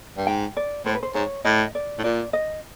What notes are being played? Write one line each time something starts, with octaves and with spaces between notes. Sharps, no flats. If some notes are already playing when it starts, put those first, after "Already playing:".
G2
G#2 G5
D5
A2 C5
B4
C5
G#2 C#5
A2 D#5
D5
A2
A#2 D5
D#5